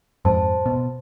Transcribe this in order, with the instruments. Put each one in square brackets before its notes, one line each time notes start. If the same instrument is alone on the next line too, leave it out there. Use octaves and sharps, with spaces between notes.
[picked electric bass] F2 G#2 [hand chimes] C5 A5 C6
[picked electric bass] B2